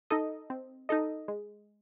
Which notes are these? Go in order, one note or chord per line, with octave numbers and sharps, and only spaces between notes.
D#4 A4 D#5
C4
D#4 A4 D#5
G#3